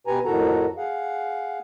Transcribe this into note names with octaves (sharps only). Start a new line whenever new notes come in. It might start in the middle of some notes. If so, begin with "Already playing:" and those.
B2 G4 B4 G#5 A#5
F2 A2 D#3 F#4 A4 A#5
G#4 F5 F#5